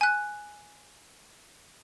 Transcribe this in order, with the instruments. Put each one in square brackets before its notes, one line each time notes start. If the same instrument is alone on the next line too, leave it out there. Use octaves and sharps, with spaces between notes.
[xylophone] G#5 F#6